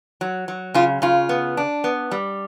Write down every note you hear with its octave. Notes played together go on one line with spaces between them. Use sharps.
F#3
F#3
C#3 F4
C#3 F4
B3
D4
B3
G3